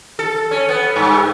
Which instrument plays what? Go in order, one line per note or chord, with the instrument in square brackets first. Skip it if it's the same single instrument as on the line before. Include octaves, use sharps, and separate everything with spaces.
[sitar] A4
C#4
B3
G2